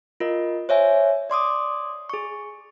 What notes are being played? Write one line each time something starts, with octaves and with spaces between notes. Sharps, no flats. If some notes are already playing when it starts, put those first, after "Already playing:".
F4 A#4 D#5
C5 C#5 E5 G#5
D5 C6 D6 D#6
G#4 C#6